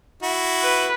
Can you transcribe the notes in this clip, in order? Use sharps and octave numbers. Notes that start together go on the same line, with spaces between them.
E4 F#4
B4